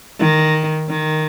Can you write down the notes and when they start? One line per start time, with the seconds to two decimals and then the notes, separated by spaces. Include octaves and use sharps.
0.20 D#3
0.89 D#3